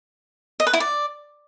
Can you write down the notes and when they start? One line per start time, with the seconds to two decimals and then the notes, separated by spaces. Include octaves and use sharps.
0.60 D#5
0.67 B4
0.73 E4
0.80 D5